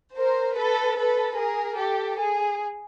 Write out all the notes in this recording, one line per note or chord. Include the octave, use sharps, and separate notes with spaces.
A#4 C5
A4 B4
A4 B4
G#4 A#4
G4 A4
G#4